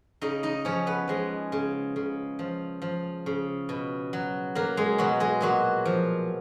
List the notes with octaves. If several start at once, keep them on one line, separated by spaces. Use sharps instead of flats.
C#3 D#4 D#5
D#4 D#5
F3 C#4 C#5
B3 B4
F3 G#3 G#4
C#3
C#3
F3
F3
C#3
B2
F#3
F#3 A#3 A#4
G#3 G#4
B2 F#3 F#4
G#3 G#4
A#2 F#3 F#4
F3